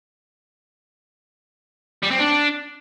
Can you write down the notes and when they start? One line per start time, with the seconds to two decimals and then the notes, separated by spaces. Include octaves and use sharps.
2.03 G3
2.11 C4
2.19 D4